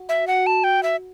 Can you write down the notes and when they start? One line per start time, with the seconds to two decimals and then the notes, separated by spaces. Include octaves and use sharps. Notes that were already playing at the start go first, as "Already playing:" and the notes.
Already playing: F#4
0.09 E5
0.27 F#5
0.47 A5
0.64 G5
0.83 E5